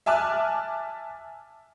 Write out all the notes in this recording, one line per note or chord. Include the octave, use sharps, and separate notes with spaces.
E5 G#5 A5 D6 F6 F#6